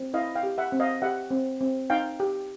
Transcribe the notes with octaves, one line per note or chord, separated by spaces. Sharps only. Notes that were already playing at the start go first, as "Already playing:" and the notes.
Already playing: C4
E4 D#5 F5
F5 G5
G4
E5 F#5
C4
D#5 F5
G4 E5 F#5
C4
C4
D#4 F5 G5
G4